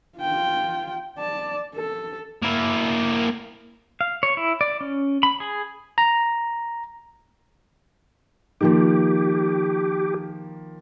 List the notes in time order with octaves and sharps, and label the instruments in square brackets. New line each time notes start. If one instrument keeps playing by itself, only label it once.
[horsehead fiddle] F4 G5
D5 A5
A4
[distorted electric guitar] A#3 E4
[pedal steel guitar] F5
C#5
E4
D5
C#4
B5
G#4
[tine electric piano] A#5
[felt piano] D#3 F3 A#3 [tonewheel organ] G4